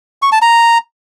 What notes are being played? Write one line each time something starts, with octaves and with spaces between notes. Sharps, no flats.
C#6
A5
A#5